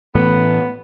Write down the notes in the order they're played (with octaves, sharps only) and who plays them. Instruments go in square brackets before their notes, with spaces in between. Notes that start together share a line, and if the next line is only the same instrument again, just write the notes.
[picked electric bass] A2 E3 A3 [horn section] B3